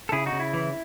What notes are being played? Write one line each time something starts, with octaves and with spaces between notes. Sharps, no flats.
A4
C#3 E4 G#4
D#4 F#4
C#3
E4
E3